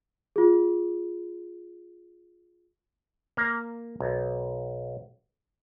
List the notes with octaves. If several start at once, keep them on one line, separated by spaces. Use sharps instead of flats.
F4 G#4
A#3
B1